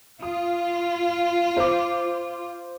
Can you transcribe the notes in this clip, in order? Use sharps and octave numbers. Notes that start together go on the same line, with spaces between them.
F4 D#6
C5 D6